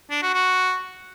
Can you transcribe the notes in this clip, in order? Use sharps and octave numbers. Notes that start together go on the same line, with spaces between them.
D4
F#4
F#4